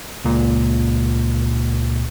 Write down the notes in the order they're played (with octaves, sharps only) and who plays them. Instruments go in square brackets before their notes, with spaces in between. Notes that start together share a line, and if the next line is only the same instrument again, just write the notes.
[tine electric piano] C#2 A#2